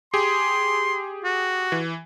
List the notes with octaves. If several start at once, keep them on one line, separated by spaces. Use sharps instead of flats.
G4 G#4 C6
F#4
E3